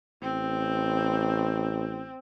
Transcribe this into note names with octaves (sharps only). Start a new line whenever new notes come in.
A1 C4